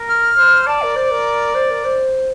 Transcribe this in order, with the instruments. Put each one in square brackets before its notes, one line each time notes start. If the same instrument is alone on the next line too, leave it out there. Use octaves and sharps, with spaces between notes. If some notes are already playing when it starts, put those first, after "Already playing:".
Already playing: [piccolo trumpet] A#4
[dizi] F6
[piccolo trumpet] C5
[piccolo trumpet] D5 [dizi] A5
[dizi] A#4
[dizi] C5 [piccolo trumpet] D5
[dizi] A#4
C5
A#4
C5